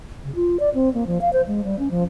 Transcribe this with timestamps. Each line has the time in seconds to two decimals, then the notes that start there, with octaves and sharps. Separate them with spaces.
0.24 C#3
0.35 F4
0.60 D5
0.74 C4
0.94 A#3
1.07 F3
1.21 F5
1.33 C5
1.47 G#3
1.64 G3
1.79 C#4
1.91 F3